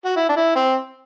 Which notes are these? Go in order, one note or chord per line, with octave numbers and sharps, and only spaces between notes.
F#4
E4
D4
E4
C4